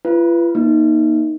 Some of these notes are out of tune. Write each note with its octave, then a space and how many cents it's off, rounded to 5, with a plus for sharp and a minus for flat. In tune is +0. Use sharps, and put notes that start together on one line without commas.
F4 -45 B4 +0
A#3 +30 D#4 +0